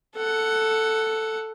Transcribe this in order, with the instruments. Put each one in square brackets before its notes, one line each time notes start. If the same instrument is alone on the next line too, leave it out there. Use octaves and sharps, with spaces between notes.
[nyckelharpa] A4 F#5